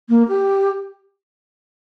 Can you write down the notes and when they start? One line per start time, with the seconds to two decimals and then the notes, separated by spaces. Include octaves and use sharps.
0.09 A#3
0.28 G4